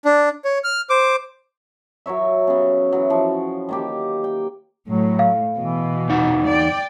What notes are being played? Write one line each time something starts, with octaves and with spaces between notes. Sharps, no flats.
D4
C#5
F6
C5 D6
F#3 A#4 C#5 E5
C#3 B3
E3 F#3
F3
D#3 A#3 G4
G5
A2 F#3
F5
B2 E3
E2 D#4 F#5
D5 G5